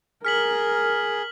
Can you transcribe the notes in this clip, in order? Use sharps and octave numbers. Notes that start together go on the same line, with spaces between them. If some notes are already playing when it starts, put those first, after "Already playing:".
G#4 A#4 F6 B6 F#7